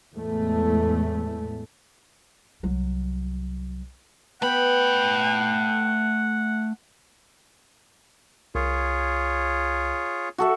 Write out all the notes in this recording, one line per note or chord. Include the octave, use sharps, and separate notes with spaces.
E2 A2 G#3 A3
C2 F#3
A3 B3 F#5 G5 B5
C2 F4 G#4 C#5
F#4 A4 E5